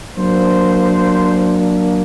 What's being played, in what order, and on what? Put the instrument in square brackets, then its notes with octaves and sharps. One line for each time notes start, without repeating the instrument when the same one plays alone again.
[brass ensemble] F#3 A#3 D4 C5